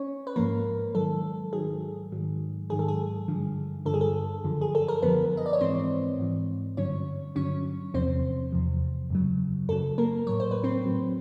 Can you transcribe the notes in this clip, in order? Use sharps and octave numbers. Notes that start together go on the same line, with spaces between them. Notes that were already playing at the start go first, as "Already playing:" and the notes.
Already playing: C#4 C#5
B4
G#2 F3 A#3 A#4
G#2 D#3 F#3 A4
G#2 D#3 F#3 G#4
G#2 D#3 F#3
G#2 D#3 F#3 G#4
A4
G#4
G2 D3 F3
G2 D3 F3 A4
G#4
A4
F#2 D3 F3
G#4
A4
A#4
F#2 D3 F3 B3 B4
D#5
D5
C#5
G#2 E3 C4 C5
G#2 E3
G2 D3 F#3 C#4 C#5
G2 D3 F#3 C#4 C#5
E2 C3 F3 C4 C5
E2 C3 F3
F#2 C#3 F#3
F#2 C#3 F#3 A4
A#3 A#4
A2 F#3 C#5
C5
B4
C4 C5
A2 F#3